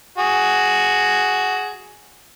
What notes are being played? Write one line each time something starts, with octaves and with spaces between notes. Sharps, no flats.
F#4 G#4